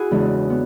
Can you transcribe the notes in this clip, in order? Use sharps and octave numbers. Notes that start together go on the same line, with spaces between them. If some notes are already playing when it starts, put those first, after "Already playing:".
Already playing: E4 F#4 G#4
E2 C#3 E3 G#3 D4
B3